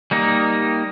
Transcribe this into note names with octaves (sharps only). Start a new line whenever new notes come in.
G3 A#3 D#4